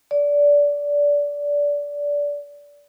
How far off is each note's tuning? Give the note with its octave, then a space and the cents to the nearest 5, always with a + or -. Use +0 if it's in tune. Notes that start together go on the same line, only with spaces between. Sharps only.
D5 -20